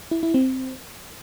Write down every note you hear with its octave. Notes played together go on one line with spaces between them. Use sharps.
E4
E4
C4